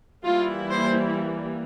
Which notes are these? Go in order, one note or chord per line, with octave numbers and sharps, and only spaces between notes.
E3 G3 A#3 E4 F4
C5